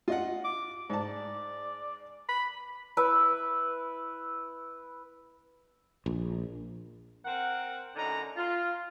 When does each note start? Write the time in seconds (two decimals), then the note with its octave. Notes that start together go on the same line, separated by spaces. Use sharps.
0.08 F4 D#5 F#5
0.44 D6
0.90 G#2 D5 A5
2.29 B5
2.97 E4 B4 E5
6.06 A#1
7.25 C4 A#4 F#5
7.96 F#2 A2 D3 D#4 A#5
8.37 F4